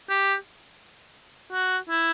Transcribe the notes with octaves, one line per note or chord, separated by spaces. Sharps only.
G4
F#4
E4